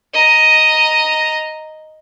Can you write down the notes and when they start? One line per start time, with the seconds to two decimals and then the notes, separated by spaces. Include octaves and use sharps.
0.14 D#5 A#5